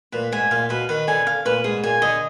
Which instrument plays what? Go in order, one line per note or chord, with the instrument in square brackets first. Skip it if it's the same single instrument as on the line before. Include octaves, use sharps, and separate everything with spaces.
[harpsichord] A#2 [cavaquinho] B4
[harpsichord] G#2 [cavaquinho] G#5
[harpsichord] A#2 [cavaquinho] F5
[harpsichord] B2 [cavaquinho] B4
[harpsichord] D#3 [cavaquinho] B4
[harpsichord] D3 [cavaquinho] G#5
[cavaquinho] F5
[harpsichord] A#2 [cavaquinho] B4
[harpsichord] G#2 [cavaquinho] G#4
[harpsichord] A#2 [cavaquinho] G#5
[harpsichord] D3 [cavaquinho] D#5